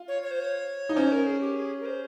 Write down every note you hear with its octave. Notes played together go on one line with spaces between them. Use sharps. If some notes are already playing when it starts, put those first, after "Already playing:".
Already playing: F4
C#5
C#5
C5
C#5
D#4
C#4 C5
A#4
G#4
G4
G#4
A#4
C5